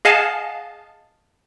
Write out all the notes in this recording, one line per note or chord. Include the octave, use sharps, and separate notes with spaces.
G#4 D#5 F5 F#5 G#5 A5